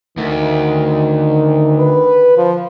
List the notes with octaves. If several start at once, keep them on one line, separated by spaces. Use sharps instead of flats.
D2 D#3
B4
F3